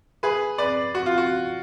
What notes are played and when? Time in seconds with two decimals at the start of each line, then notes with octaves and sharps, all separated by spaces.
0.23 G#4 B4
0.58 B4 D5
0.95 F#4
1.06 F4
1.18 F#4